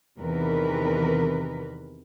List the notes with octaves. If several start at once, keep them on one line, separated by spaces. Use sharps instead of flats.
E2 C3 D#3 E3 A#4 B4